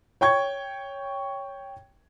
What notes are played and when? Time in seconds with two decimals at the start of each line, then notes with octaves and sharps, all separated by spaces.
0.21 C#5 G5 C#6 G#6